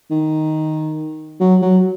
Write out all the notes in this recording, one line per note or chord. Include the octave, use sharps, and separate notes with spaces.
D#3
F#3
F#3